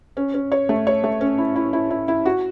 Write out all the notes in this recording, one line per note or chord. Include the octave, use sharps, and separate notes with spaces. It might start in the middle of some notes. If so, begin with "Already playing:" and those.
C#4
C#4
C#5
A3
C#5
A3
C#4
E4
E4
E4
E4
E4
F#4